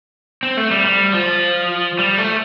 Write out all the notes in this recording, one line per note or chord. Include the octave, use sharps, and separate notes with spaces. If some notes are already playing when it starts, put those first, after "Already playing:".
C4
A3
G3
G3
F3
G3
A3